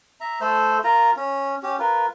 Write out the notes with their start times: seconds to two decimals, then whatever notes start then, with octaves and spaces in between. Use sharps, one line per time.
0.20 E5 A#5
0.41 A3 A4 C5
0.84 F4 A#4 A#5
1.16 C#4
1.63 C#4 G4
1.79 F4 A#4 B4